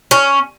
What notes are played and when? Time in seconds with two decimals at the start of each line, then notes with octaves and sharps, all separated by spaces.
0.11 C#4